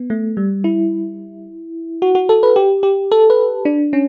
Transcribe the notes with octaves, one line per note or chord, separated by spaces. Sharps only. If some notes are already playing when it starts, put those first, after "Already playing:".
Already playing: B3
A3
G3
E4
F#4
F#4
A4
B4
G4
G4
A4
B4
D4
C#4